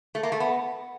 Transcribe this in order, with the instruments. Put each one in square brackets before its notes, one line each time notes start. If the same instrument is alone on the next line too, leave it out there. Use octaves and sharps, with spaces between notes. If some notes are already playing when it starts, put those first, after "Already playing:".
[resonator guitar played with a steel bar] A3
A#3
A3
B3